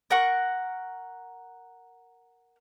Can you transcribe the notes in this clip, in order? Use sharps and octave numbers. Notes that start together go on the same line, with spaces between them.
A#4 F#5 C#6